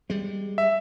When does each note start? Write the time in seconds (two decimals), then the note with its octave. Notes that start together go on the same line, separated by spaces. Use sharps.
0.10 G3 G#3
0.58 E5